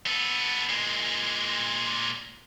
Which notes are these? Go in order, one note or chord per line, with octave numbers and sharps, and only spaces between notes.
B3 A4
A#2 G#3